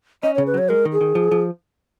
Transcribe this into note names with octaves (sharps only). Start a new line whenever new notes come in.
C#4 D#5
C#5
C#3
B4
F#3 C#5
G#3 A#4
D#3
G#4
D#3
F3
F3